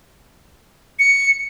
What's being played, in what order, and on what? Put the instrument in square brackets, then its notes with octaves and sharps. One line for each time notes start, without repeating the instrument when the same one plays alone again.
[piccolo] C#7